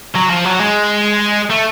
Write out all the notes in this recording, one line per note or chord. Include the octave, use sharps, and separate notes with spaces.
F#3
F3
F#3
G#3
A3